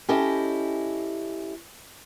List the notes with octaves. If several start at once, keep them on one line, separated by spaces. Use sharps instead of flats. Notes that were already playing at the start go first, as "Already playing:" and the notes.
C#4 E4 G4 A4 D#5